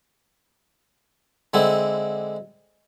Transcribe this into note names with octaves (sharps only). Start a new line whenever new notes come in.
D3 G#3 C4 E4